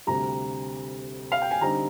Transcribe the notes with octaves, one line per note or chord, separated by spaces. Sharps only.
D2 C3 G3 A#5
F5
G5
G#5
D3 G3 C4 D#4 A#5